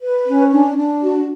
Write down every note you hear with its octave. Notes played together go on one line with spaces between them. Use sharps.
B4
C#4
D4
D4
F#4